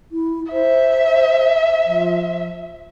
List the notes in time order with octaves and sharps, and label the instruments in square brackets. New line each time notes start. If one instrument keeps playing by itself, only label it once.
[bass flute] E4
[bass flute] C5 [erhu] E5
[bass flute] F3